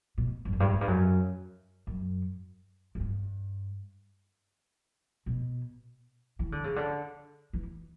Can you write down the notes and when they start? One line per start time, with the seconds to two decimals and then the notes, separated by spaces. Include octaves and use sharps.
0.18 B2
0.45 G2
0.53 F#2
0.60 G2
0.73 F#2
0.81 G2
0.88 F#2
1.87 F#2
2.95 F#2
3.00 G2
5.26 B2
6.39 E3
6.52 D3
6.64 C#3
6.76 D3
7.53 E3